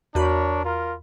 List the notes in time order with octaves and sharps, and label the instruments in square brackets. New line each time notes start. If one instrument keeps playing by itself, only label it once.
[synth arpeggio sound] E2 F#4 B5 [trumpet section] D4 A#4 C#5
[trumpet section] F4 A#4